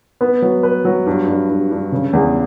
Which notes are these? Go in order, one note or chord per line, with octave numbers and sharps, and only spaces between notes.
B3
F#3
B4
F#3
G2
G2
G2
G2
C#3
E2